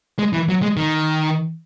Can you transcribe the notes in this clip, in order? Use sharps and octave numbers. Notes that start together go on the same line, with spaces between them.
G#3
E3
F#3
G#3
D#3